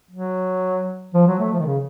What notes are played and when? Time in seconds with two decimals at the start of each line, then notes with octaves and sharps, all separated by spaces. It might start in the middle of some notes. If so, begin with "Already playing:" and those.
0.11 F#3
1.14 F3
1.28 F#3
1.39 A3
1.53 F3
1.60 D#3
1.65 C#3